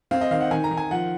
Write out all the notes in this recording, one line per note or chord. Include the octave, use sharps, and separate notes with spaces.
C4 F5
D#5
D#3 F5
F#5
D#3 G#5
A#5
D#3
G#5
F3 F#5